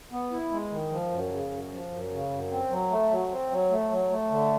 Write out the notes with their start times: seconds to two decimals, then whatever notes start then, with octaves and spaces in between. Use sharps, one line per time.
0.12 B3
0.32 E4
0.51 G#3
0.71 D#3
0.91 F3
1.11 F#2
1.31 C#3
1.51 F#2
1.72 F3
1.91 F#2
2.11 C#3
2.31 F#2
2.51 C4
2.71 F#3
2.91 A3
3.11 F#3
3.31 C4
3.51 F#3
3.71 A3
3.91 F#3
4.10 A3
4.31 D3